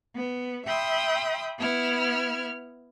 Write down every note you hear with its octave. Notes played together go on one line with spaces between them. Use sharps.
B3
E5 G5 B5 C6 D#6
B3 E4 F6